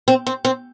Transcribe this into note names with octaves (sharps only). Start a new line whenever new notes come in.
C4
C4
C4